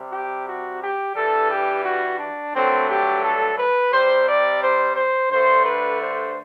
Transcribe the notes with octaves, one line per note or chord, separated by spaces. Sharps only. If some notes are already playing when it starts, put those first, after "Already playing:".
Already playing: C3 G3
G4
F#4
G4
G2 E3 G3 A4
G4
F#4
D4
G2 D3 F#3 A3 C4
G4
A4
B4
C3 G3 C5
D5
C5
C5
G2 D3 A3 C5
B4
C5